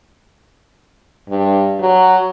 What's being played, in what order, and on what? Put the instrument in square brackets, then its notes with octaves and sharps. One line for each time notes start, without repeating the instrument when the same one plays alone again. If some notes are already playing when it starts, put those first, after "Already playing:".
[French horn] G2
F#3